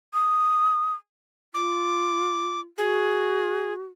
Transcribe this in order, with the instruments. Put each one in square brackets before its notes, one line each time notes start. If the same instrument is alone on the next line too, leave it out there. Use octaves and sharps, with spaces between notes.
[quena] D#6
[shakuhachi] F4 [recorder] D6
[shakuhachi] F#4 [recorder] G#4